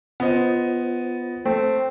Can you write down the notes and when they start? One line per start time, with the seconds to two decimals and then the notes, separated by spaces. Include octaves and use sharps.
0.20 B3 F4 C5 D#5
1.45 A3 C4